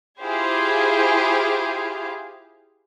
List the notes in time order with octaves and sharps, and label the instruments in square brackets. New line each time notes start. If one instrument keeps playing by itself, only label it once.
[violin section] E4 F4 G4 G#4 C5 F5